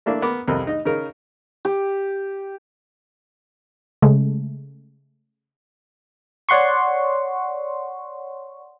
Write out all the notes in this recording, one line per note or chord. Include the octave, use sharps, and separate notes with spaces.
A3 A#3 D4 E4
B3 A#4 D6
C2 F2 A#4 D#5
D#4 D#5
C#3 D#4 A#4
G4
C#3 G#3 A3
C#5 D5 F#5 C6 C#6